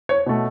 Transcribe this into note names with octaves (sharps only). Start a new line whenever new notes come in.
C#5
B2 A3